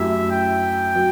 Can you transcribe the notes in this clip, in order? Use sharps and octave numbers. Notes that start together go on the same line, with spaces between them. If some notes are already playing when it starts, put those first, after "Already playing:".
Already playing: F#2 F#3 A3 E4 G4 E5
G5
F#3